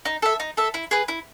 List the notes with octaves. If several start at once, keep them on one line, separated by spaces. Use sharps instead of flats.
D#4
A4 E5
D#4
A4 E5
E4
G#4 B4
E4